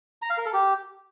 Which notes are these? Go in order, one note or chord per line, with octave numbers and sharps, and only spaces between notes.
A#5
F5
A#4
A4
G4